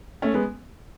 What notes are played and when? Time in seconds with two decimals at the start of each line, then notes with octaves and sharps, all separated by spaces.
0.22 A3 C#4
0.34 G#3 B3